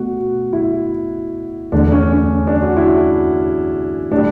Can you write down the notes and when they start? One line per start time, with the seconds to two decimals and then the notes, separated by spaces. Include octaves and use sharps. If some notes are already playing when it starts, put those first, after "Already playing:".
Already playing: B2 A3 F#4
0.53 E4
1.72 E2 D3 A3 D4
1.92 C#4
2.12 C#4
2.47 D4
2.62 F#4
2.77 E4
4.11 A2 G3 D4